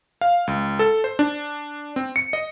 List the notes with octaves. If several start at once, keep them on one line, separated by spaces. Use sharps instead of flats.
F5
C#2
A4
C5
D4
C4
C#7
D#5